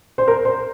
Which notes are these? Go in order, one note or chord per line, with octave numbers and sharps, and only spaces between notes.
C5
A#4
C5